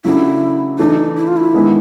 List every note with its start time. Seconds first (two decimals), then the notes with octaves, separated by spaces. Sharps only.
0.05 C#3 F#3 A3 D4 E4
0.79 E3 A3 D4 D#4
1.17 E4
1.27 F4
1.37 E4
1.54 D#3 G#3 B3 D4